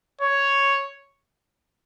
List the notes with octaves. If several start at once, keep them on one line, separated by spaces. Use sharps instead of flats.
C#5